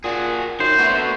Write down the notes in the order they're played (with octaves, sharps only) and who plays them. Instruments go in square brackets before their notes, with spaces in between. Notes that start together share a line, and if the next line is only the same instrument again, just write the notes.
[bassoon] A#2 [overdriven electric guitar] F#4 G#4
[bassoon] F#2 [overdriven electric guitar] D#3 [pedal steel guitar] C5
[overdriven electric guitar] A3 F#4 [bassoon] B3